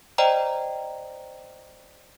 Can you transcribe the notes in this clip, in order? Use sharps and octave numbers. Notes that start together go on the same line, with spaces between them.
C5 D5 D#5 G5 A#5